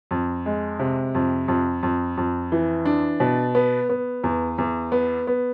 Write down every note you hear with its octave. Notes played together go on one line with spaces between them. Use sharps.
F2
G#3
C3
F2
F2
F2
F2
E3
D4
B2
B3
B3
E2
E2
B3
B3